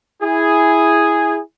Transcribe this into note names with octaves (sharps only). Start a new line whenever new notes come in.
E4 G#4